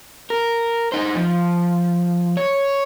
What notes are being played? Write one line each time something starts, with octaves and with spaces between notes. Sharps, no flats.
A#4
D#4 C5
F3
C#5